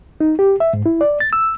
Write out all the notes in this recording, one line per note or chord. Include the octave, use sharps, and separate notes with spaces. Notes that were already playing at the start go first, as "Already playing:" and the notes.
D#4
G4
E5
G#2
E4
D5
A6
E6